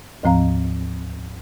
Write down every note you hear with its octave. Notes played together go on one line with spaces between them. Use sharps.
D2 G#2 F3 C4 F5 A#5